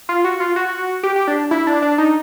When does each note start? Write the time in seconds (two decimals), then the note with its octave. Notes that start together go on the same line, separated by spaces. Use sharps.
0.09 F4
0.24 F#4
0.40 F4
0.56 F#4
1.03 G4
1.16 G4
1.27 D4
1.51 E4
1.67 D4
1.82 D4
1.98 D#4